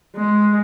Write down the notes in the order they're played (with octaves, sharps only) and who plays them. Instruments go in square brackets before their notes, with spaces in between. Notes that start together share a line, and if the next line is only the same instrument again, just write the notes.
[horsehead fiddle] G#3